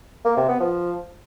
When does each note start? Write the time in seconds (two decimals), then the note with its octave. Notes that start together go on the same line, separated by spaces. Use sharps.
0.25 A#3
0.37 C3
0.49 B3
0.60 F3